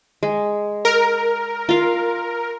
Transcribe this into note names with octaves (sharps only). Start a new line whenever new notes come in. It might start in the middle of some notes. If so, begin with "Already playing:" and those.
G#3
A#4
F4 F5